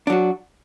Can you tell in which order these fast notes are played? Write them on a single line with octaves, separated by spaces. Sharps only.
D4 F#3 F#4